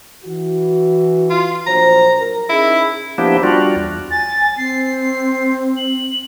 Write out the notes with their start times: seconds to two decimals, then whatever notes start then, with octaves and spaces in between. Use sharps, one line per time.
0.25 E3 F#4
1.30 F4
1.67 A#1 F#3 C5 A#5
2.19 A#4
2.49 C#4 D#4 E4 G#4
3.18 F3 A#3 B3 D4 E4 G4
3.43 G3 D4 F4 F#4
3.76 E2
4.10 G#5 A6
4.57 C4 C7
5.76 F#7